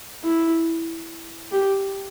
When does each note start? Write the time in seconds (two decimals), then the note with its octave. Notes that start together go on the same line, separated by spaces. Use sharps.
0.24 E4
1.52 G4